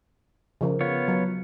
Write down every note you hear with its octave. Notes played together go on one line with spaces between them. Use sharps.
C#3 F3 A#4
B3 F4 C#5
F#3